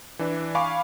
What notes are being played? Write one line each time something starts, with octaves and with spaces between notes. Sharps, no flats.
E3 D4 B4
F5 G#5 B5 C#6 D6